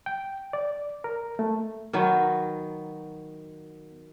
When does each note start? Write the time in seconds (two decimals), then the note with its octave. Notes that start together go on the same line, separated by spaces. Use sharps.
0.06 G5
0.53 D5
1.04 A#4
1.39 A3
1.93 D#3 F#3 B3